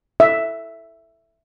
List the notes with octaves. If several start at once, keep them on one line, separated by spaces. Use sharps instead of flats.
E5